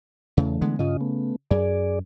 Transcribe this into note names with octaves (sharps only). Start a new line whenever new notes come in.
E2 C#3 E3 A3
D3 G#3 B3
G2 C#3 F4 D#5
A3 B3
F#2 G#4 D5